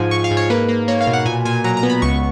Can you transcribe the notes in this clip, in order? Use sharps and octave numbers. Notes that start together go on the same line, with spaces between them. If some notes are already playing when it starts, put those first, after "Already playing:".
Already playing: G#2 F3 G#5
G#2 C#6
F5
G#2
C#5
A#3 B4
A#3
A#3 C#5
F5
B2
F#5
A#2 G#5
A#2 G#5
F#3 A#5
A#5
B3
B5
C#2 C#6